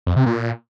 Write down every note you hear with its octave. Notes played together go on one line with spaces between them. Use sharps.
F2
C3
A#2